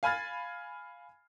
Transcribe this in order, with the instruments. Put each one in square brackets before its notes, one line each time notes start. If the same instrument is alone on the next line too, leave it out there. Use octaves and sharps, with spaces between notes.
[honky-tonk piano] F5 G#5 B5 F6 G#6 A6